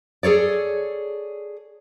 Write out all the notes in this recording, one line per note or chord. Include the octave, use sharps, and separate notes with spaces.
G#4 A4 C#5 D5